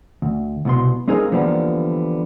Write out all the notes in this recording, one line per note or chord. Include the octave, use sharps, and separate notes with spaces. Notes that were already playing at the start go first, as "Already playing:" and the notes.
D2
C2 B2 C6
G#3 C4 D#4 F4 G#4 A#4
D3 E3 F3 G3 A#3 B3